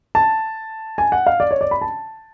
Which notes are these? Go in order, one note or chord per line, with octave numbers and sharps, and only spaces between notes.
A5
G#5
F#5
F5
D5
C#5
D5
B5
A5